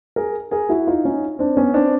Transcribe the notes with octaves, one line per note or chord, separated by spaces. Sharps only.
G#4 A#4
G#4 A#4
E4 F#4
D#4 F4
C#4 D#4
C4 D4
B3 C#4
C4 D4